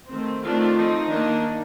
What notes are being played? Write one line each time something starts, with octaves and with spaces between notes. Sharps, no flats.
D#3 A3 C4
D#3 A3 C4 D4 F4
F3 C4 D#4
D#3 A#3 D4